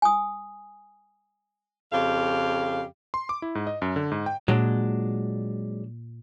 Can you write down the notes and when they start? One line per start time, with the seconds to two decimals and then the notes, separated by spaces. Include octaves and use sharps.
0.02 G#5 D#6
1.93 F2 C#3 G4 F5
3.14 C6
3.29 D6
3.42 E4
3.55 G#2
3.67 D#5
3.82 F#2
3.96 D3
4.12 G#2
4.26 G5
4.48 A#2 F#3 G#3 D4